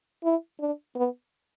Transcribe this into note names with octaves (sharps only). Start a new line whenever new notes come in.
E4
D4
B3